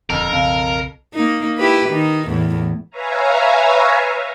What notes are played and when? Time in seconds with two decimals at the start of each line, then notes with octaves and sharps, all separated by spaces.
0.10 D#1 F2 D3 A#4
0.33 B1 C#3 C4 F5 A5
1.14 A#3 D#4
1.58 E4 G4 B4
1.89 D#3 D#4
2.28 E2 A2
2.90 B4 C#5 E5 F5 G#5 A#5